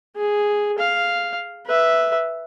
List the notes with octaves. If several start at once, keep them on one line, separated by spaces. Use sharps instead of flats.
G#4
F5
B4 E5